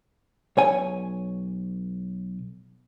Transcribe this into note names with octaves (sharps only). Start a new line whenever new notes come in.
B1 C#5 G#5